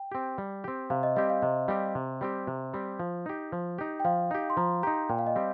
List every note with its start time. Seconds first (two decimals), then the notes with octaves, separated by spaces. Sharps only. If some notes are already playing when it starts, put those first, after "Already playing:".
Already playing: G5
0.12 C4 G4
0.38 G3
0.64 C4 G4
0.90 C3 F5
1.03 D#5
1.16 G3 C4 G4 D#5
1.30 F5
1.42 C3 D#5
1.68 G3 C4 G4
1.95 C3
2.21 G3 C4 G4
2.47 C3
2.73 G3 C4 G4
3.00 F3
3.26 D#4 G4
3.52 F3
3.78 D#4 G4
4.00 G5
4.05 F3 F5
4.31 D#4 G4
4.50 C6
4.57 F3 A#5
4.83 D#4 G4 A#5
5.09 A#2 G5
5.19 F5
5.27 D#5
5.36 G3 C4 G4